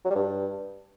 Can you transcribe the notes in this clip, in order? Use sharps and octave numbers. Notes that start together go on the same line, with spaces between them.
F#3
G3
G2